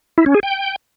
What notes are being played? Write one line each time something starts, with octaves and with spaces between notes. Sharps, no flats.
E4
C#4
G#4
G5